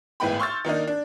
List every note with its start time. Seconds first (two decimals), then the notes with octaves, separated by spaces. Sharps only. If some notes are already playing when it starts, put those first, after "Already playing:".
0.20 G#1 A2 G#3 B3 G5 B5
0.40 C6 C#6 E6 F6 G6 A6
0.65 D#3 A#3 D4 D#4
0.87 D4